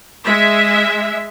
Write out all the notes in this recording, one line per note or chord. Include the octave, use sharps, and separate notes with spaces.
G#3 E5